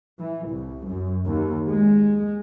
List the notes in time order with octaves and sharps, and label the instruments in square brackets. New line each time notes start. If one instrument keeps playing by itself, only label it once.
[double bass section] E3
C2
F#2
D#2
G#3